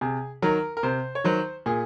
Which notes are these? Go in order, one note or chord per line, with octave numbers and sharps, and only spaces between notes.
C3 G#4
D#3 F#3 A#4
A#4
C3 C5
C#5
D#3 F#3 C5
A#2 G#4